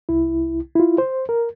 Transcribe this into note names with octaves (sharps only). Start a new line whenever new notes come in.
C2 E4
E4 F4
C5
A#4